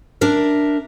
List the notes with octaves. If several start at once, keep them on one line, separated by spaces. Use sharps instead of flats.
D4 A#4 E5